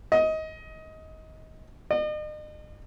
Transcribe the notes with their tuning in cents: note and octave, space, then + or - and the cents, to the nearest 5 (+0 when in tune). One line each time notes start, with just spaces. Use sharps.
D#5 +20
D#5 -40